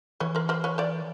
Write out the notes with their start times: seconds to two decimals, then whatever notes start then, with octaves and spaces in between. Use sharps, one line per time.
0.20 E3 B4 C#5
0.35 A#4 C5
0.49 A#4 C5
0.64 B4 C#5
0.78 C5 D5